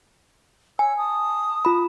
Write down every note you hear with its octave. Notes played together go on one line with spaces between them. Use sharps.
C#5 G#5 E6
A5 D#6
F4 B5